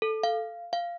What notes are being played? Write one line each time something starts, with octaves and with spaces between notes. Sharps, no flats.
A4
F5
F5